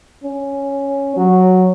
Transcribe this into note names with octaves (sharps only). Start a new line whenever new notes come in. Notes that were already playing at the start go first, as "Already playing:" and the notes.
C#4
F#3